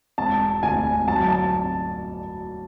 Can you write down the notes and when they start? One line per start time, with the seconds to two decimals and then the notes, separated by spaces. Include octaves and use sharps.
0.18 E1 A5
0.63 D2 G#5
1.08 F#3 A5
1.28 A5